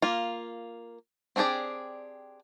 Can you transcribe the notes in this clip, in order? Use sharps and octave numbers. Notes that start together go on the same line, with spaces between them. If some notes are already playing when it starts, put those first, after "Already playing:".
A#3 F4
C4 D4 G4 G#4 D5